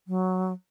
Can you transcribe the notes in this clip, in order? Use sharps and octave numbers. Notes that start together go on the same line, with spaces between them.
F#3